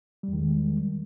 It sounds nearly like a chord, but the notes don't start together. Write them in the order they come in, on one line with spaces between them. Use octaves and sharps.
G3 E2 D#3 G#3